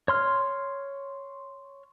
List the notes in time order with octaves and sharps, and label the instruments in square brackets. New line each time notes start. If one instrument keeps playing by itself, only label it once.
[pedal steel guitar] C#5 C6 F6